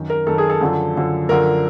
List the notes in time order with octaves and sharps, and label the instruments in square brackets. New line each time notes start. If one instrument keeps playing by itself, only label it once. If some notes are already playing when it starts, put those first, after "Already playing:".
Already playing: [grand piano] F#2 D#3
A#4
F#2 D#3 A4
G#4
A4
F#2 D3 F3
F#2 D3 F3
F#2 D3 F3 A#4